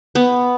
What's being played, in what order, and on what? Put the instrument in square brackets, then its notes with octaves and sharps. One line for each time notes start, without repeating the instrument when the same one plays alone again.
[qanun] B3